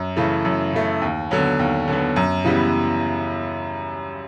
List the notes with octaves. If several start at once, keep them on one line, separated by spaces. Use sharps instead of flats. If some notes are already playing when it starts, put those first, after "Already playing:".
Already playing: F#2
C#3 E3 A3
F#2
C#3 E3 A3
D#2
D3 F#3 B3
D#2
D3 F#3 B3
F#2
C#3 E3 G3 B3